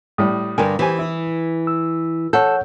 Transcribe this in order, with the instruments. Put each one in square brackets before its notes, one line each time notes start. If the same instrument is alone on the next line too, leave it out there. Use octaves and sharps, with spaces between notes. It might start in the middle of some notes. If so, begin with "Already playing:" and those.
[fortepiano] A2 G3 [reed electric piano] D#6
[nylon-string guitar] G2 D3 [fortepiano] A#4 G5 G#5
[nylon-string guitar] E3 [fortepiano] G4 C5 G#5
[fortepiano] E4
[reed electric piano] E6
[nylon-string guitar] A4 [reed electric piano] C#5 F#5 G6